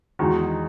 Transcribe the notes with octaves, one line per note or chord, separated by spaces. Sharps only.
E2 D#3 G#3 D#4 F#4